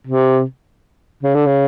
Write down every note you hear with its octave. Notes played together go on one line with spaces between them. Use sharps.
C3
C#3
D3
C#3